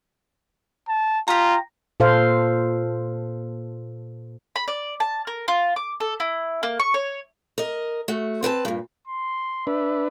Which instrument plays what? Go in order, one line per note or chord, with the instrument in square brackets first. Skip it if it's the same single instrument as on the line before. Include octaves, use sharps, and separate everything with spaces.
[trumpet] A5
[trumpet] F4 [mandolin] G4 A#5
[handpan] A#2 A4 C5 F5
[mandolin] B5
D5
A5
A#4
F4
D6
A4
E4
A#3
C#6
C#5
[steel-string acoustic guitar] A#4 D#5
A3 F#4
C4 B4 G#5 A5
G2 A#2
[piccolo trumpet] C6
[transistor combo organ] D4 B4 [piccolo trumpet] E5